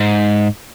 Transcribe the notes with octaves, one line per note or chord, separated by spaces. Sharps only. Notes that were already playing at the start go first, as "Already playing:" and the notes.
Already playing: G#2